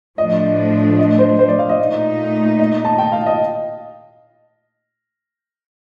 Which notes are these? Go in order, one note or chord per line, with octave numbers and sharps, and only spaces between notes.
A2 F3 A3 D4 D#5
D#5
C5
C5
D5
F5
D#5
A#2 A3 D#4
D#5
A5
G5
F5
D#5